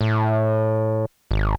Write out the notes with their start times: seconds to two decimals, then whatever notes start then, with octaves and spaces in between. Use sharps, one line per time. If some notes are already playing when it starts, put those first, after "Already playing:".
0.01 A2
1.31 G#1